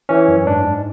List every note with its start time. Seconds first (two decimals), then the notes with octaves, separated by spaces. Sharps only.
0.09 E3 C#4
0.28 F#2
0.46 G#2 D4
0.65 G#2